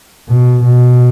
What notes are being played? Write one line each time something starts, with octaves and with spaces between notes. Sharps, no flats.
B2
B2